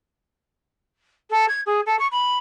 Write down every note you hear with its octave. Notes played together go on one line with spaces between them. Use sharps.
A4
G#6
G#4
A4
C#6
B5